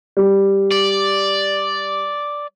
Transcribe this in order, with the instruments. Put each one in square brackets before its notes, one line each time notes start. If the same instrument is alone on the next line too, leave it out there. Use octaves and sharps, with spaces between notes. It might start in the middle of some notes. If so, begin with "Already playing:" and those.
[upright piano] G3
[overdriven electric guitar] D5